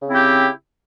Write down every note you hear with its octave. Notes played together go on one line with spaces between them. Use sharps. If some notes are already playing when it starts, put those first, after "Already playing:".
C#3 C4 E4 G4